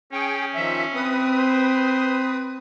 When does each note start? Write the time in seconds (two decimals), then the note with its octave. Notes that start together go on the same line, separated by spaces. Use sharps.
0.13 C#4 G#4 G5
0.55 D#3 F3 E5
0.95 C4 B4 D#6
1.38 C5